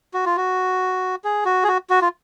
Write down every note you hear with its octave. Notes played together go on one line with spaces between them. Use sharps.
F#4
F4
F#4
G#4
F#4
G#4
F#4
F#4
F4